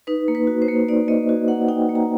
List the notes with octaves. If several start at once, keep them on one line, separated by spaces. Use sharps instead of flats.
D#4 B4
A#3
B4
F#4
C5
A#3
D#4 D5
A#3 D#5
F#4
A#3 F#5
D#4 G5
A#3
A#5